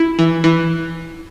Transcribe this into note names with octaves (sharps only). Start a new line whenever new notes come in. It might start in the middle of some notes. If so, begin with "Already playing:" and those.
Already playing: E4
E3
E3